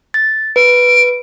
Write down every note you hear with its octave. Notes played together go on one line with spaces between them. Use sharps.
A6
B4 D7